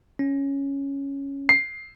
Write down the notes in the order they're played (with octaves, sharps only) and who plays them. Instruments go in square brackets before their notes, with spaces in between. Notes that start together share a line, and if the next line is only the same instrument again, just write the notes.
[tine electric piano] C#4
[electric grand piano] C7